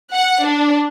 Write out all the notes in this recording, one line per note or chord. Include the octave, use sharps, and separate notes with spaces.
F#5
D4